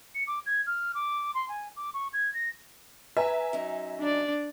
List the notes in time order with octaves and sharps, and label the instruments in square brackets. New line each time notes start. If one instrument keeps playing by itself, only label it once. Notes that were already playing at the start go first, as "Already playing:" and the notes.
[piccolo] C#7
D6
G#6
F6
D6
C6
G#5
D6
C#6
G#6
A#6
[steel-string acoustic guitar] B4 [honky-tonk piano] E5 G#5 A#5
[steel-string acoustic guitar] F#2 D#4
[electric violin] D4 D5